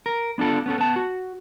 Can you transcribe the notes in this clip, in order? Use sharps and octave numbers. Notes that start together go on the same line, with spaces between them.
A#4
B3 D4 F4 A4
B3 C#4 A4
B3 A5
F#4